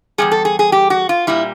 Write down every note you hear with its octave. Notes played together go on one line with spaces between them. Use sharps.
E2 B2 G3 G#4
A4
G#4
G#4
G4
F#4
F4
A#2 G3 E4